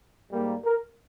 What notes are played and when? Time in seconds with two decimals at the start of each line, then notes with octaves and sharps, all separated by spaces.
0.32 G#2 G3 A#3
0.65 A#4